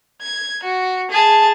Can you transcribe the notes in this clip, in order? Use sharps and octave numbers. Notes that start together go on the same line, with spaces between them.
G#6
F#4
G#4 A5